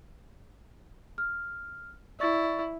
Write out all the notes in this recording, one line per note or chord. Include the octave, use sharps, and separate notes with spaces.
F6
E4 D5 C#6 A6